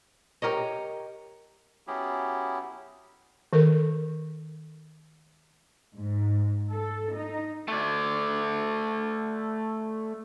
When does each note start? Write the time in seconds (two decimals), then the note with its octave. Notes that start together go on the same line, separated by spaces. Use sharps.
0.42 G4 A#4 C#5 D#5
1.87 F#3 B3 C#4 E4 G4 G#4
3.53 D#3 A4 A#4
5.96 G#2
6.72 A4
7.16 D#4
7.68 A3 D5